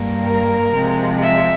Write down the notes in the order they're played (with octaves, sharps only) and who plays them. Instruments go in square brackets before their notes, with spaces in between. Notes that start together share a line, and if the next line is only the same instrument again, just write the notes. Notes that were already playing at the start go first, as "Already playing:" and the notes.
Already playing: [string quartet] G2 G3 A#3
A#4
C3 F3 G#3
E5